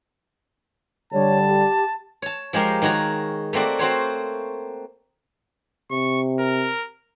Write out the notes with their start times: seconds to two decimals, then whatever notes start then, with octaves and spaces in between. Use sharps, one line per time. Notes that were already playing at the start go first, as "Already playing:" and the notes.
1.13 D3 G3 C#5 A5
1.48 G4
2.22 C#5 A5
2.53 F3 G#3 G4 A#4 F5
2.82 D#3 G#3 F#4 C#5 A#5
3.53 A3 A#3 C4 F#4 D5
3.79 C4 F#4 C5 C#5
5.91 C3 C#6
6.39 A#4